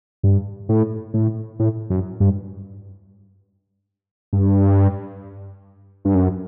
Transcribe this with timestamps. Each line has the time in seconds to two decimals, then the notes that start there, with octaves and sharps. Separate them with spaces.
0.23 G2
0.69 A2
1.14 A2
1.60 A2
1.90 F#2
2.20 G2
4.33 G2
6.05 G2
6.15 F#2